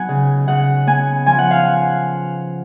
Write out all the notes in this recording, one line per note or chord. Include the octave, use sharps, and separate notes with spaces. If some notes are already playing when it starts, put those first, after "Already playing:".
Already playing: F#3 B3 D#4 F#5 G#5
C#3
C#3 F#5
B3 G#5
F3 G#5
F#5
F5
F#5